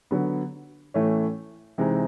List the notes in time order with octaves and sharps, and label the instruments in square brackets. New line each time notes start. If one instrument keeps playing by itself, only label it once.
[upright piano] D3 F#3 B3
A2 E3 A3 C#4
C3 E3 G#3 C4 D#4